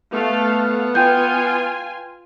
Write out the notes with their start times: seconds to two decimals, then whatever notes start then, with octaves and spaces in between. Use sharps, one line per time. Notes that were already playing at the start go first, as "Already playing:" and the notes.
0.13 A3 B3 A4 F5
0.95 F4 B4 G5 G#5 G6